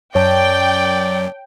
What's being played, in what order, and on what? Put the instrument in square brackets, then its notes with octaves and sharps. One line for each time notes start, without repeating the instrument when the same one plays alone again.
[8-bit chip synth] F#2 [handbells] C#5 A5 [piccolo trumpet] D5 [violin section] G5